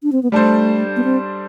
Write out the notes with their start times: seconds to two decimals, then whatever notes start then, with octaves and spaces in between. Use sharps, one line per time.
0.03 D4
0.12 C4
0.23 B3
0.32 G3 A3 D4 A4 C5
0.96 B3
1.04 C4